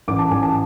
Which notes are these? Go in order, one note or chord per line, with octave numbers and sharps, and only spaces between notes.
A1 D6
A5
A1 G#5
A5